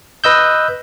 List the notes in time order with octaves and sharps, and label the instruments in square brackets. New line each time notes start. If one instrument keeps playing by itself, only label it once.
[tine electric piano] B4 D#5 E6 G6